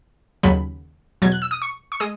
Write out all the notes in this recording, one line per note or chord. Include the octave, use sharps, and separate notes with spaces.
D#2 C#3 F#3 B5
E2 B2 F#3 G#6
F#6
E6
D#6
C#6
C#6
G#3 D#6